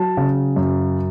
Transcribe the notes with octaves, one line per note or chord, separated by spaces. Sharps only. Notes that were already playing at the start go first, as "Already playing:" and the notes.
Already playing: F#3 A5
C#3
F#2